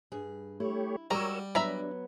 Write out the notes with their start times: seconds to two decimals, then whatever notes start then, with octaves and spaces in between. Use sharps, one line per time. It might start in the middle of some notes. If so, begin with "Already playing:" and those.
0.12 G2 G#4
0.60 A3 E4 G4 C#5
1.11 G3 G#3 F#4 A#4 C#5 A#5 E6
1.55 F#3 B3 D4 E5 A#5 B5